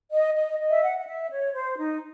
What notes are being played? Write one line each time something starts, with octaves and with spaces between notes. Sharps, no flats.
D#5
D#5
D#5
E5
F#5
F#5
E5
C#5
C5
D#4